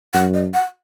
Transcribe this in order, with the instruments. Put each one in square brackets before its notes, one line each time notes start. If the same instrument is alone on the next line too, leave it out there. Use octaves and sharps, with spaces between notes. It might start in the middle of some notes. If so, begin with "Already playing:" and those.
[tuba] F#2 [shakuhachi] F#5
[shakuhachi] D#5
F#5